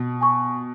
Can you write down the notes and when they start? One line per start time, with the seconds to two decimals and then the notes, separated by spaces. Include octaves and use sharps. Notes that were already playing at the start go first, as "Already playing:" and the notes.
Already playing: B2
0.21 G#5 C#6